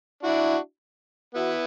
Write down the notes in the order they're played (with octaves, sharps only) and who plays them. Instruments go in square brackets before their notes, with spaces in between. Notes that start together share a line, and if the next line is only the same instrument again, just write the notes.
[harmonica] D4 F#4 [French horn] E4
[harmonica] B3 E4 [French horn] F#4